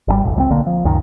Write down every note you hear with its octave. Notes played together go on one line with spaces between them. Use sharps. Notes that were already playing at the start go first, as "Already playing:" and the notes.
G#1 B2 G3
E1 A1
C#2 G#3 C4
B1 D3 A#3
F3
C#2 F#2 D#3